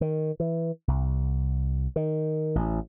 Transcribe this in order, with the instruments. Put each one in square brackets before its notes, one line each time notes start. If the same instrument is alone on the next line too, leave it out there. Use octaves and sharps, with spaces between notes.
[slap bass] D#3
E3
C2
D#3
A1